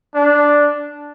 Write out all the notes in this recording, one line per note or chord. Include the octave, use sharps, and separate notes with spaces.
D4